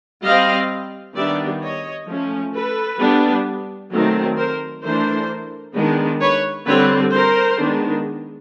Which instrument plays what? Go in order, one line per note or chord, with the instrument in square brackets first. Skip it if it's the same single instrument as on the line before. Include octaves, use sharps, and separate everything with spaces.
[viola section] G3 C4 D#5 F5
D#3 G3 B3 D4 D5 E5
C#5 D#5
F3 A3 C#4
A4 B4
G3 B3 D4
D#3 F#3 A3 C4
A#4 C5
E3 A3 D4 A#4 C5
D#3 G#3 B3 D4
B4 C#5
D3 G3 C4 B4 C#5
A#4 C5
D#3 G#3 B3 D4